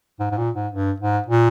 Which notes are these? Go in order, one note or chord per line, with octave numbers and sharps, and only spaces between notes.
G#2
G#2
A#2
G#2
G2
G#2
A#2